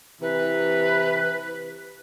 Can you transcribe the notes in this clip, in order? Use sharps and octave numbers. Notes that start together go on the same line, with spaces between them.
C3 E3 B4